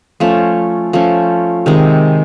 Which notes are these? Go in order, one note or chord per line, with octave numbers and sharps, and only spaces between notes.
F3 A3 C#4
F3 A3 C#4
C3 D#3 G#3